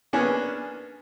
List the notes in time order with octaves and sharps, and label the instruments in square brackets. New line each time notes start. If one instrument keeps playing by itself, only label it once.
[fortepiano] A#3 B3 C#4 D4 G#4